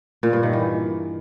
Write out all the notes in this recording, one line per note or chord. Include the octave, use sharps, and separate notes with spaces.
A#2
G2
D#3
E3